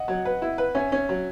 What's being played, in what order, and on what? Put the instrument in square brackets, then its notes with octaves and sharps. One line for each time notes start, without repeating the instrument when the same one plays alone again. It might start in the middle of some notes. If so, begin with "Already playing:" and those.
Already playing: [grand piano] D#5 F#5
[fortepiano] F#3
B4
E4
B4
[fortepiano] C#4 [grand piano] E5 G#5
[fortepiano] C#4
F#3